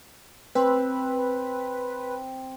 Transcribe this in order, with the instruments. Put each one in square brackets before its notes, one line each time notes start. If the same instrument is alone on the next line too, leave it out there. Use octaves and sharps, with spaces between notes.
[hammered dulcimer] C4 [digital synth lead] B4